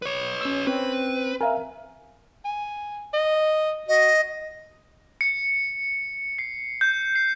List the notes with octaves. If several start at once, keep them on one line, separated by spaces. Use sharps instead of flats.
B4 C#5
C#4 E6
C4 B4 C#5
A#4 E5 F5 G#5
G#5
D#5
F#4 D#5
C#7
C7
G6
C7